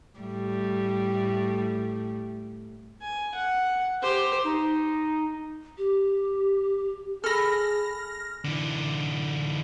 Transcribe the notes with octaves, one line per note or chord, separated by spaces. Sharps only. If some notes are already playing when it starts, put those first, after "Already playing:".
A2 G3 A3
G#5
F#5
G4 C5
D#4
G4
G#4 A4 B5 F6 A#6
D3 E3